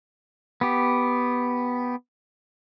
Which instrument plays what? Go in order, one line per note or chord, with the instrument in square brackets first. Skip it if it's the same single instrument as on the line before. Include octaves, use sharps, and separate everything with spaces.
[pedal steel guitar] B3 G4